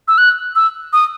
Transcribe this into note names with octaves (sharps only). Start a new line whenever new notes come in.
E6
F#6
E6
D#6